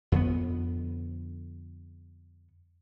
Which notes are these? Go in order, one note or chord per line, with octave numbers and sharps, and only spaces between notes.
F2 D3 B3